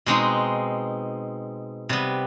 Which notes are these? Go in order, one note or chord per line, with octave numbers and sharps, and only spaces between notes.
B2 G#3 C4 D#4
C3 G3 B3